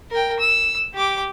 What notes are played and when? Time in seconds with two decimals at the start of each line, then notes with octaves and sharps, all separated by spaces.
0.11 A#4 G5
0.39 E6
0.94 G4 D6